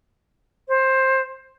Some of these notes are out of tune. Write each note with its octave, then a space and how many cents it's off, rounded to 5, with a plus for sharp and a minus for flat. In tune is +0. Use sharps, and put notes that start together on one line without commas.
C5 +15